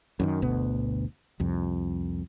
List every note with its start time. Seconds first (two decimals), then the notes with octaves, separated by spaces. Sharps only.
0.20 F#2 D3 D#3
0.42 G1 D2 B2 B3
1.40 C2 F2